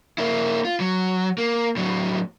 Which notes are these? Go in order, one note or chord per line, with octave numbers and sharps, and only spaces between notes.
A#3 E4
F4
F#3
A#3
A2 F#3